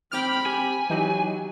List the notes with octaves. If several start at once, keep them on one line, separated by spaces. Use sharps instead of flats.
C4 G5 B5 D6 F6
G4 G#5
E3 F#3 D#4 G4